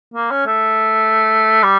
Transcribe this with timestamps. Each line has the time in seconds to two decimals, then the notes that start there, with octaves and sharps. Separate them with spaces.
0.14 A#3
0.31 C#4
0.46 A3
1.63 G3